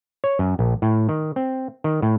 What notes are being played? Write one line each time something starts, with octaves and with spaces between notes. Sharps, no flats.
C#5
F#2
A#1
A2
D#3
C4
D#3
A2